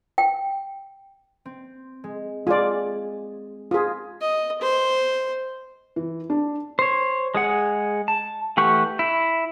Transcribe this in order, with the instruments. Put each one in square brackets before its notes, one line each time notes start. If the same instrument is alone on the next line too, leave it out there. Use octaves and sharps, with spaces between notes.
[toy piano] G5
[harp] C4
G#3
[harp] G#3 G#4 [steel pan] F4 D5
[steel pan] F4 G#4 [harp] D#6 A#6 B6
[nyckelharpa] D#5
C5
[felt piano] E3
D4
[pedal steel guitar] C5 C#5
G#3 G#4 F#5
A5
E3 A3 G4 F#5 C#6
E4